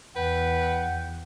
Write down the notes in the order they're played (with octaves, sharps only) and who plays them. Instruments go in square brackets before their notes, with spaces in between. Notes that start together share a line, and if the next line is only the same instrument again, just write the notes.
[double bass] E2 [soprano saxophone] B4 [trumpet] F#5 [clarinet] G5